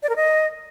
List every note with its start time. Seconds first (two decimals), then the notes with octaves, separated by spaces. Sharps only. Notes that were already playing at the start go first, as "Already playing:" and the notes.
0.03 D5
0.09 A#4
0.16 D#5